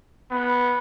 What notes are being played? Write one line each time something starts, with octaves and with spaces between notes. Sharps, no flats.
B3